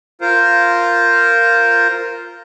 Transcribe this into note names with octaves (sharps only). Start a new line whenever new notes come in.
F4 A#4 C5